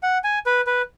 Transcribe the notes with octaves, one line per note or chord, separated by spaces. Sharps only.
F#5
G#5
B4
B4